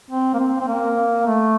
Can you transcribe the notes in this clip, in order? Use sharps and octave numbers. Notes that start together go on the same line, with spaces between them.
C4
A#3
C4
C4
A#3
A3